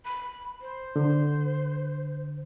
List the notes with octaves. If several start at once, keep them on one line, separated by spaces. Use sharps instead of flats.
B5
C5
D3